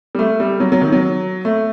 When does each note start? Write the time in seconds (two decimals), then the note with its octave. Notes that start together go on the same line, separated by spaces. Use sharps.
0.15 G3
0.19 A3
0.40 G3
0.60 F#3
0.72 F#3
0.81 D#3
0.92 F#3
1.45 A3